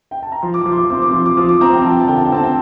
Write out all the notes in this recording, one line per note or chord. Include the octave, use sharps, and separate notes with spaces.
G5
A5
A#5
F3 C6
D6
F3 D6
C6
D6
C4 D6
D6
F3 C6
D6
F3 D#6
D6
C4 A#5
G5
F3 A5
G5
A5
D3 G5
A5
G5
C4 A5
G5